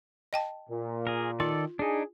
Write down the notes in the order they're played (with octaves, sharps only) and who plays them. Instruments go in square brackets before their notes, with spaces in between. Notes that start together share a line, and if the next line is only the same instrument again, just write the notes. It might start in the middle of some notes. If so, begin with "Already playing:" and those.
[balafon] D#5 G5 A5
[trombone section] A#2
[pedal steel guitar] G#4 A#4
[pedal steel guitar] D#3 A4 D5 [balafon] F4
[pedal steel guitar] D4 D#4 [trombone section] G#4